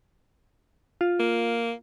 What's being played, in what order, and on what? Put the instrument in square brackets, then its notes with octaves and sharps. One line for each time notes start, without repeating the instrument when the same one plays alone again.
[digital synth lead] F4
[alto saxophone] A#3